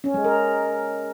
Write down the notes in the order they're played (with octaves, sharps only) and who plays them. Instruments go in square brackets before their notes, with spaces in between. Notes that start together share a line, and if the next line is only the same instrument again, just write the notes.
[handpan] C#4
G#3
A#4